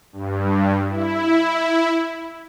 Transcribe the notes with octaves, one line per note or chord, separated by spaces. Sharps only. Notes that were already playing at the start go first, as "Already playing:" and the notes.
G2
E4